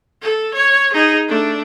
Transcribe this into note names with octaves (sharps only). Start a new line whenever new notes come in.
A4
C#5
D#4 G#4
A3 D4